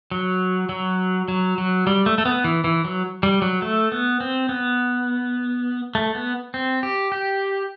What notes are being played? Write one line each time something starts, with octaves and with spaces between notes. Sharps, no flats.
F#3
F#3
F#3
F#3
G3
A3
A3
B3
E3
E3
F#3
G3
F#3
A3
B3
C4
B3
A3
B3
C4
G4
G4